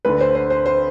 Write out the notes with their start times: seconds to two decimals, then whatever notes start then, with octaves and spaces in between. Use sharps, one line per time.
0.05 D2 D3 B4
0.20 C5
0.35 C5
0.50 C5
0.66 C5